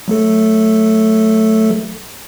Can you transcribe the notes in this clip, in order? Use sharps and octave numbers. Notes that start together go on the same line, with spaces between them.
F#3 A3 A4